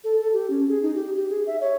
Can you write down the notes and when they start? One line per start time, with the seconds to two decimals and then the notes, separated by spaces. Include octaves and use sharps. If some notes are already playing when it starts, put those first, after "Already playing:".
0.04 A4
0.20 A4
0.33 G4
0.50 C#4
0.68 G#4
0.82 D#4
0.95 G4
1.16 G4
1.30 G#4
1.47 E5
1.61 C#5